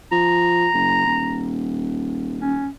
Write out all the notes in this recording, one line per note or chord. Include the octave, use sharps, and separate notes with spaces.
F3 A#5
F#1
D#1
C#4